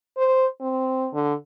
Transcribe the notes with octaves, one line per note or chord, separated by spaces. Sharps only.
C5
C4
D3